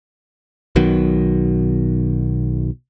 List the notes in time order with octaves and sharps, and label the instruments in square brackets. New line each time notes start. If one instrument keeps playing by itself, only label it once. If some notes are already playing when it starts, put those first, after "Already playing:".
[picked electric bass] B1 B2 D#3 F#3